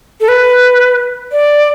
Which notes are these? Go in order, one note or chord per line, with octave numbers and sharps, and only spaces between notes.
A4
B4
D5